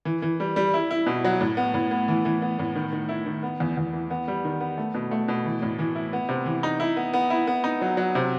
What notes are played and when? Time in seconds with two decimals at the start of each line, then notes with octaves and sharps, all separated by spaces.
0.05 E3
0.22 E3
0.40 G3
0.56 G3
0.74 E4
0.91 E4
1.06 B2
1.24 F#3
1.41 A2
1.57 B3
1.74 A2
1.91 B3
2.08 E3
2.25 E3
2.42 B3
2.59 A2
2.76 D#3
2.93 D#3
3.09 E4
3.26 D#3
3.43 B3
3.60 E2
3.77 E2
3.93 E3
4.10 B3
4.28 G3
4.45 D#3
4.61 B3
4.78 A3
4.94 B2
5.11 A3
5.28 B2
5.45 E3
5.62 A2
5.79 E3
5.95 E4
6.13 B3
6.29 C3
6.46 E3
6.63 D#4
6.80 E4
6.97 B3
7.13 B3
7.30 E4
7.47 B3
7.64 D#4
7.81 F#3
7.97 F#3
8.15 C3